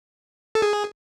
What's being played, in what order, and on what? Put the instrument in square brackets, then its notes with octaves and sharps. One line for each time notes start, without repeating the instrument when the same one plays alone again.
[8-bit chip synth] A4
G#4